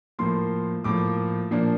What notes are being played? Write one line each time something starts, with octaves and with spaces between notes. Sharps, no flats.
A2 F3 A#3 C6
A2 F3 A#3 D6
A#2 F3 A#3 D4